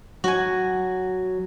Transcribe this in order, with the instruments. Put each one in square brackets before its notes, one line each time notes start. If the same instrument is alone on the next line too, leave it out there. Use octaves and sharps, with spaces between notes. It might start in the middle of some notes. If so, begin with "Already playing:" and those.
[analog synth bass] F#3 [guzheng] F#4 G#5